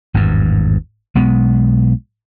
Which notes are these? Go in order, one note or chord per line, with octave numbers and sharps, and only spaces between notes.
G#1 E2 G2
B1 B2 G#3 B3